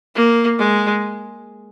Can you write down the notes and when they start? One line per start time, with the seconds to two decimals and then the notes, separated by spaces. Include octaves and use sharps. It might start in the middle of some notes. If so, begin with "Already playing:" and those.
0.15 A#3
0.59 G#3